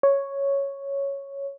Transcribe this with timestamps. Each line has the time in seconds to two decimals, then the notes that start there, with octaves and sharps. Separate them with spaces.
0.03 C#5